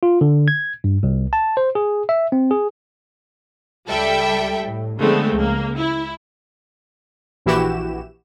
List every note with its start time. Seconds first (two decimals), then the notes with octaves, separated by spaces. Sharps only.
0.03 F4
0.21 D3
0.48 G#6
0.84 G2
1.03 C2
1.33 A5
1.57 C5
1.75 G#4
2.09 E5
2.32 C4
2.51 G#4
3.89 C#2 G3 A4 E5 G5 B5
4.63 A2
4.98 D3 F3 G#3 A3 B3 C4
5.33 C#2 A#3
5.77 E4
7.46 A#1 E3 E4 F#4 G4 E7